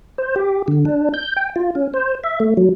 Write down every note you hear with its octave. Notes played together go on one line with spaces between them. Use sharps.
C5
G4
D3
D4
G6
G5
F4
C#4
C5
E5
A3
F#3